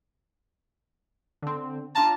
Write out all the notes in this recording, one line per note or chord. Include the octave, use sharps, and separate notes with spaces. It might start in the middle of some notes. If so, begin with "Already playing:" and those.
D3 C4
D4 F4 A5 A#5